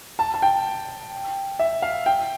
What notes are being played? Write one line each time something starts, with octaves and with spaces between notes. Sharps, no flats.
A5
A5
G5
E5
F5
G5